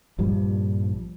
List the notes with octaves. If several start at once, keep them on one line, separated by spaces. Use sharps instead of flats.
A#1 G2 F3 G3